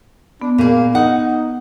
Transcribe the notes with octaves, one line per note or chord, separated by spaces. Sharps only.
B3 D4
A#2 A#3 G#4
D#4 F#5